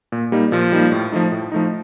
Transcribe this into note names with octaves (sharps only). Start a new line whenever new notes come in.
A#2
G3 A#3 D#4
A#2 F3
G3 A#3 D#4
A2
F3 A3 D#4
A2
F3 A3 D#4